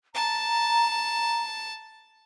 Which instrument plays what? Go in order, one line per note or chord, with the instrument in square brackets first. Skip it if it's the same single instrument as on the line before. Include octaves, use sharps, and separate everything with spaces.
[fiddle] A5 [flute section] A#5